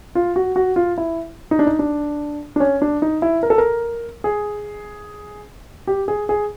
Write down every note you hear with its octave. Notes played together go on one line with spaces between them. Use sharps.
F4
F#4
F#4
F4
E4
D#4
D4
D#4
D4
D4
C#4
D4
D#4
E4
A#4
A4
A#4
G#4
G4
G#4
G#4